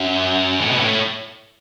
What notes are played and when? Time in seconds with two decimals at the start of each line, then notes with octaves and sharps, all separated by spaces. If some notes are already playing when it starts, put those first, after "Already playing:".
Already playing: F#2
0.60 A2
0.71 B2
0.80 A2